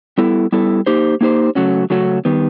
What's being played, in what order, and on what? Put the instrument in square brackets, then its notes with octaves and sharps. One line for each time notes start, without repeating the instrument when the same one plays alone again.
[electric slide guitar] G3 B3 E4 A4
G3 B3 E4 A4
A#3 D#4 G4 C5
A#3 D#4 G4 C5
C#3 F#3 A3 C#4 F#4
C#3 F#3 A3 C#4 F#4
D#3 G3 B3